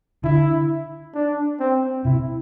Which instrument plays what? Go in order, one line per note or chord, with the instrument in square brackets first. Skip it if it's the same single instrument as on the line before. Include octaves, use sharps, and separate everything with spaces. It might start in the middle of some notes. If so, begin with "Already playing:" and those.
[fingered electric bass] D3 [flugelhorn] E4
[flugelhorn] D4
C4
[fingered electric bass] C3 [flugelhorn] E4